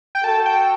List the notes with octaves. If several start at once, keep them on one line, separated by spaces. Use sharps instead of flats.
G5
F#4 A4 A5
G5